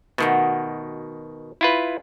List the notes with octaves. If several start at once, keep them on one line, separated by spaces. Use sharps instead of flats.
B2 D#3 A3 F#4 G4
E4 F4 B4